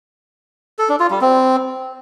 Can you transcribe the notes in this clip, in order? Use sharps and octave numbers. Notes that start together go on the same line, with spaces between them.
A4
D4
F4
G3
C4